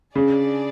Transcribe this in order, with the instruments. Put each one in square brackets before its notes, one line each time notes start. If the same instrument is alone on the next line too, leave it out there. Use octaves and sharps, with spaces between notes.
[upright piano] C#3 [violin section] D4 G#4 D5